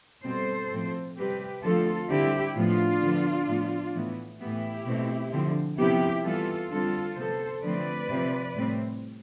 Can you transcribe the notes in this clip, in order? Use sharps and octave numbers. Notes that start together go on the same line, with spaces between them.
B2 G3 C4 A4 C5
A2 F3 C4
C3 G3 C4 G4 B4
D3 F3 A3 C4 F4 A4
D3 G3 C4 E4 G4
A2 F3 B3 D4 F4
D3 F3 B3
A2 F3 B3
A2 E3 B3
A2 E3 B3 E4 G4
B2 A3 C4
D3 F3 C4
C3 F3 B3 E4 G4
E3 G3 B3 F4 A4
D3 G3 C4 F4 A4
C3 F3 B3 A4 C5
D3 F3 A3 C4 B4 D5
C3 F3 C4
A2 G3 C4